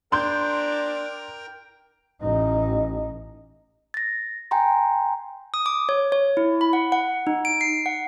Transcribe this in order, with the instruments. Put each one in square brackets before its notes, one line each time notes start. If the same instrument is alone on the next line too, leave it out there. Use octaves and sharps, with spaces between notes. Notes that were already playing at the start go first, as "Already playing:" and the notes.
[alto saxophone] D4 [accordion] A#4 G5 A#5 [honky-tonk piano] C6 G6
[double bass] A1 D#4
[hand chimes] A6 A#6
G5 G#5 A#5 C6
[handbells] D#6
D6
C#5
C#5
E4
B5
F#5
F#5
D#4
D7
C7
F#5